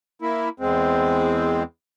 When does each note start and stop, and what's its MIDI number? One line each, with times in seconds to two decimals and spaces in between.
0.22 0.49 58
0.22 0.49 64
0.60 1.63 40
0.60 1.63 56
0.60 1.63 60